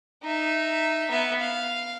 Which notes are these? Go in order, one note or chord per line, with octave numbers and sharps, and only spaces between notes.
D#4 E5
B3 E5
F5